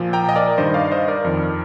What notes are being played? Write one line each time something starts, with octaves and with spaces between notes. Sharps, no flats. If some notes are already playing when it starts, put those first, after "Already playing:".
Already playing: A#2 F3
G5 A#5
D#5
A#4 D5
G2 D#3 C5 D#5
D#5
D5 F5
C5 D#5
A#4 D5
F2 D#3